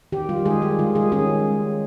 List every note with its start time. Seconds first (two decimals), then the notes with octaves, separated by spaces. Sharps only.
0.12 D#3 G4
0.29 G3 F4
0.45 D#3 G#3 G#4
0.62 G3 G4
0.79 D#3 F4
0.95 D#3 G#3 G#4
1.12 G#3 C#4 G#4